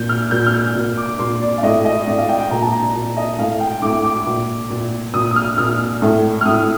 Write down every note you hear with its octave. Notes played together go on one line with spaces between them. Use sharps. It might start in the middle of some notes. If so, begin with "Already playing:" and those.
Already playing: A#2 G6
F6
A#2 G6
F6
G6
A#2
D6
A#2 C6
D5
F5
A2 D#5
D#5
A2 D5
F5
G5
G5
A#2 A#5
A5
A#5
A#2
D#5
A2 F5
G5
A2 D6
D6
A#2
A#2
A#2 D#6
D#6
F6
A#2 F6
A2
F6
A2 D#6